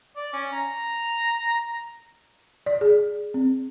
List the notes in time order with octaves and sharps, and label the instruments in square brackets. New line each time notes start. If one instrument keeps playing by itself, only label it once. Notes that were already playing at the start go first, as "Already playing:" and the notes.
[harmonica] D5
C#4
A#5
[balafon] D5
G#4
C4